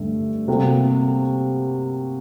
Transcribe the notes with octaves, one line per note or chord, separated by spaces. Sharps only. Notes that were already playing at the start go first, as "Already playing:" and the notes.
Already playing: G2 D3 A3
C3 G3 A#3 F#4 A4